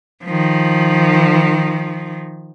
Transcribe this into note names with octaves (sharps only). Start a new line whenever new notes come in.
D#3 F3